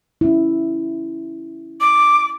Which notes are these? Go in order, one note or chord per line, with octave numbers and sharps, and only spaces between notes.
C#4 E4
D6